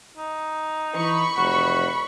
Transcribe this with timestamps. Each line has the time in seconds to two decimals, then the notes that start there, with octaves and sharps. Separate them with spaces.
0.17 D#4
0.95 E3 B5 C#6
1.37 F1 F#4